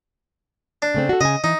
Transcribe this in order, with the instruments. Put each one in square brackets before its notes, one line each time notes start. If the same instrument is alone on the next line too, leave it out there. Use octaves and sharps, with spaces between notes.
[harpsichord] D4
[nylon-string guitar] C#3 A3 C4
F#4 A4
[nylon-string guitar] C#3 G#5 [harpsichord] D#5
[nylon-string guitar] E3 [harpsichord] D#4